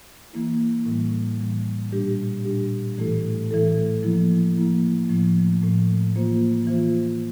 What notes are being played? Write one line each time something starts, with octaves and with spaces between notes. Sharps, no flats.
E3 A#3 E4
A2 E3 G3
A2 E3 G3
A#2 G3 D4 G4
A#2 G3 D4 G4
A2 E3 A3 E4 A4
A2 E3 A3 E4 A4
F3 A#3 E4
F3 A#3 E4
A2 F3 A3
A2 F3 A3
E3 A#3 F4 C5
E3 A#3 F4 C5